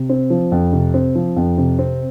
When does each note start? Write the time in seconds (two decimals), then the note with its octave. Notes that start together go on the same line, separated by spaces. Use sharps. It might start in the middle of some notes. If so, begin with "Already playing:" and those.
Already playing: C3
0.09 C4
0.30 F3
0.52 F2
0.73 C3
0.94 C4
1.15 F3
1.36 F2
1.58 C3
1.79 C4